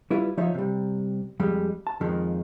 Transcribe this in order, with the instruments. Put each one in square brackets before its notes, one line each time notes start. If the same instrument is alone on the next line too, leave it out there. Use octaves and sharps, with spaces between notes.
[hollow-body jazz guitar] G3 E4 F4 B4
F3 D#4 F4 C#5 E5
C3 G3
F2 G3 G#3
A5
F2 D#3 F3 G#3